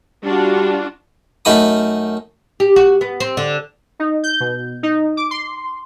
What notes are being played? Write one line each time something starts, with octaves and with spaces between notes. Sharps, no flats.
G3 D4 F4 F#4
F#2 A3 D#4 B5 D#6
G4
F#4
B3
C4
D3
D#4
G6
B2
D#4
D6
C6